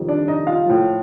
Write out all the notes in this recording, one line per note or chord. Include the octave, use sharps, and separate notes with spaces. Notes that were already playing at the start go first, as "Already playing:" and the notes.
Already playing: F2 D#3 G3
D4 D5
D#4 D#5
F4 F5
A2 F3